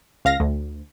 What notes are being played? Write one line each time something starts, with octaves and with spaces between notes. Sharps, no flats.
C#2 F5 A#6
D2